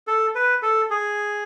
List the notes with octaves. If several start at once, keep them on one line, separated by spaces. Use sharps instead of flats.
A4
B4
A4
G#4